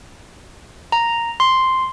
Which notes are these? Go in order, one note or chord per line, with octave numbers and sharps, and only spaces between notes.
A#5
C6